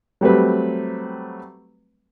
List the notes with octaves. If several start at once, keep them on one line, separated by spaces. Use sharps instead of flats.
F#3 G3 A3 C4 B4